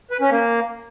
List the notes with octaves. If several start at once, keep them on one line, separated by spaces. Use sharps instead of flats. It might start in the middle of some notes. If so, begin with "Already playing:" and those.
B4
C#4
A#3